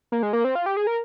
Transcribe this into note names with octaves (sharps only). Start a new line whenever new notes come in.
A#3
G#3
A#3
C4
F4
G4
G#4
A#4